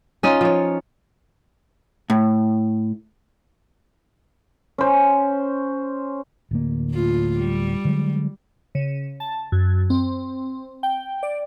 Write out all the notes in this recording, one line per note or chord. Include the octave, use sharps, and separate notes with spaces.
C#4 D#4 F4
F3 C#5
A2
C#4 C5
D1 D2 A#3
A2 F4
G3
D3 F#3 G#3
C#3
A5
F#2
C4
G5
D5